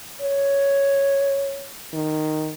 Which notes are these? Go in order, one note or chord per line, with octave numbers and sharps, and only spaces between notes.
C#5
D#3